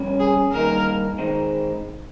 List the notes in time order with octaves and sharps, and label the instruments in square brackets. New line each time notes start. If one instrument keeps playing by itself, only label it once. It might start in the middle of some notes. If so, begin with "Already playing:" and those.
Already playing: [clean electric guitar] F2 C3 G3 C#4
[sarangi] G#4
[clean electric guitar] G2 D#3 A#3 D#4 [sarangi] A#4
[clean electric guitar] D#3 G#3 C4 D#4